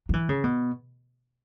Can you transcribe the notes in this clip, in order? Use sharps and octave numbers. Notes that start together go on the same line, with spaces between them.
F#3
E3
C#3
B2